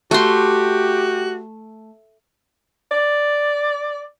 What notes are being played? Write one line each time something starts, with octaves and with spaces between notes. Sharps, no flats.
A3 F#4 G4 C6
D5